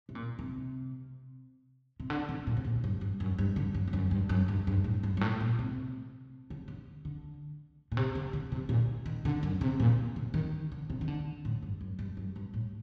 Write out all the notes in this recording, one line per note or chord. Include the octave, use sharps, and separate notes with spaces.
C3
A#2
C3
C3
D3
C3
A#2
C3
A#2
G2
G2
F#2
G2
D3
G2
G2
F#2
G2
F#2
G2
G2
A2
G2
G2
A2
A#2
C3
D3
D3
D3
A#2
C3
D3
D3
C3
A#2
D#3
D3
F#2
C3
A#2
D3
D#3
D3
C3
D#3
D3
A2
G2
F#2
G2
F#2
G2
A2